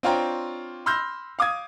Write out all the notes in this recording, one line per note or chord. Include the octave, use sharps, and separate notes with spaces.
C4 D4 F4 C#5 G5 A#5
B5 C6 E6 F6 G6 A#6
F5 D6 D#6 G#6